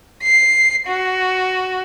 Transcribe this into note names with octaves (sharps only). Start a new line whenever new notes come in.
C7
F#4